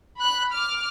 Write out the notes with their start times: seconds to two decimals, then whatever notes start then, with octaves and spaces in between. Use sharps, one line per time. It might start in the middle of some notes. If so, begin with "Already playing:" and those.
0.18 B5 F#6
0.51 D6 F6